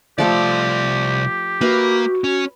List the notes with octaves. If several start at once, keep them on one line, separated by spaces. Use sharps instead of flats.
C2 F3 A3 G4 A4 D5
A#3 F#4 B4 E5
C#4